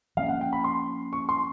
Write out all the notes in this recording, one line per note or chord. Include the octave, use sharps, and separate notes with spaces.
F3 A#3 C#4 F5
F#5
G5
B5
C6
C#6
C6